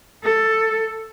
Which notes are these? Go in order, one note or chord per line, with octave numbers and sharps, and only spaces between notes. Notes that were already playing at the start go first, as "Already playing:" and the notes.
A4